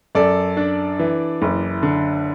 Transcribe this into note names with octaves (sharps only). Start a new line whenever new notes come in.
F#2 A4 D5
D4
E3
F#1
D3